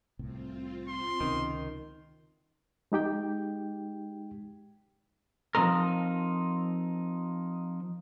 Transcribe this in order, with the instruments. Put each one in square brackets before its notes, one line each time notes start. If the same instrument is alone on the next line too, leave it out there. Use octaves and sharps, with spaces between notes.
[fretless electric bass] C2 A2 C3 [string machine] C4 F4
[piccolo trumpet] C6
[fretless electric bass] C#2 C3 C#4 [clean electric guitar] D#3
[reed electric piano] G#3 D#4 G4 G5
[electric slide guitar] F3 G#3 C4 D#4 A#4